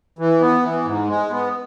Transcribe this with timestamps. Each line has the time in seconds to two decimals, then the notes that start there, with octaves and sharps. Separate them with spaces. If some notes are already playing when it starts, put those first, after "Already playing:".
0.19 E3
0.41 B3
0.63 E3
0.85 G#2
1.08 G#3
1.30 B3